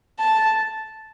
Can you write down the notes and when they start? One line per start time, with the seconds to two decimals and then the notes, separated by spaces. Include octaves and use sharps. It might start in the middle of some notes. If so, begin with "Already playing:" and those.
0.19 A5